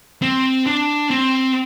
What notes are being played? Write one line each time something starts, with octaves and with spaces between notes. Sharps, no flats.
C4
D4
C4